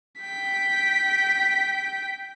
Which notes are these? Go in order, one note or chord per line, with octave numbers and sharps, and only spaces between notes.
G5 B6